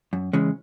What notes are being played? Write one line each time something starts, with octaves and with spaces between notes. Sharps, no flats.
F#2
C#3 E3 G#3 C#4